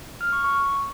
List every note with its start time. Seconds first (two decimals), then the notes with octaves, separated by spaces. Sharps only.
0.21 F6
0.33 C#6
0.44 C#6